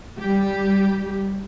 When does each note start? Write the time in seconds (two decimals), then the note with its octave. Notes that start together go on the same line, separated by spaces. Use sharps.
0.19 G3 G4